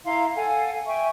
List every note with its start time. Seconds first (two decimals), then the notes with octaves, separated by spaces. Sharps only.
0.06 E4 F5 A#5 C6
0.36 A4 F5 F#5 G#5
0.87 E5 G5 G#5 C#6